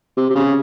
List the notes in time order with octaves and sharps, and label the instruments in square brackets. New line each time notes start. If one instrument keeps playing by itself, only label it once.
[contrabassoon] C3
C3
C#3